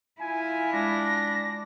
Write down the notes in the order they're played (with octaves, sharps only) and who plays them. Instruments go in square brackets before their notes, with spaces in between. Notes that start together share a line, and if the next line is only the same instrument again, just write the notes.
[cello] E4 F4 [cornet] G#5
[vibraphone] G#3 [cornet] D4 [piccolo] A#6